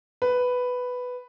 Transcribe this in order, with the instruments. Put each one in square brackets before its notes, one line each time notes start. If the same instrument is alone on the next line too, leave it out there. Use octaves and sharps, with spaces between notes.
[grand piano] B4